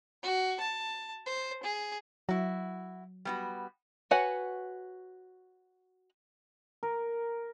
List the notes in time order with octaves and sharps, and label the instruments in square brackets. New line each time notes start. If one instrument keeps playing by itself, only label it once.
[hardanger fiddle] F#4
A5
C5
G#4
[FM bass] F#3 [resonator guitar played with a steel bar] E4 F#4
[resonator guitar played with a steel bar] G3 B3 F#4
[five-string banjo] F#4 B4 C#5 F#5 G#5
[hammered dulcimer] A#4